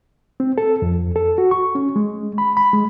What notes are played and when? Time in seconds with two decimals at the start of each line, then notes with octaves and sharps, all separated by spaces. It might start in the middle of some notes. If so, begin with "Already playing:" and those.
0.40 C4
0.58 A4
0.82 F2
1.16 A4
1.38 F#4
1.51 C#6
1.75 C#4
1.96 G#3
2.38 B5
2.57 B5
2.73 G#3